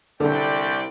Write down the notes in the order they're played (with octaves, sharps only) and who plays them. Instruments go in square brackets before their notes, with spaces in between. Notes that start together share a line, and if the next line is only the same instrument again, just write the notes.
[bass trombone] C2 [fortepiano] D3 [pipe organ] D5 G5